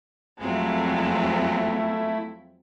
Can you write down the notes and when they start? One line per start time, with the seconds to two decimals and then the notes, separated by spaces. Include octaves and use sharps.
0.39 F2 F#3 G#3 A3 C4 E4 F4